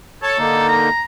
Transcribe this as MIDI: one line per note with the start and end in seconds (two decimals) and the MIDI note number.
0.23 0.64 69
0.23 0.38 73
0.23 0.38 81
0.38 0.89 50
0.38 0.89 58
0.38 0.89 63
0.68 1.02 82